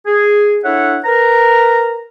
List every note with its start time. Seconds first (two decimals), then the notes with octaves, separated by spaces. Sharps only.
0.06 G#4
0.64 D4 E4 A4 C#5 E5 F#5
1.05 A#4 B4 A#5